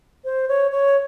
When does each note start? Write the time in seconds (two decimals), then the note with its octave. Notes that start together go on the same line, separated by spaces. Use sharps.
0.25 C5
0.48 C#5
0.71 C#5